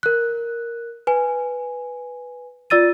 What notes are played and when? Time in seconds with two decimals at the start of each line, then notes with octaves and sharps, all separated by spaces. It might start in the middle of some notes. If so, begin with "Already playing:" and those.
0.03 A#4 F#6
1.07 B4 G#5
2.70 F4 D5 E6 A6 D#7